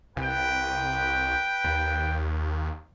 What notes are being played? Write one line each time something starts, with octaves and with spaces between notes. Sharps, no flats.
C2 B4 G5
D#2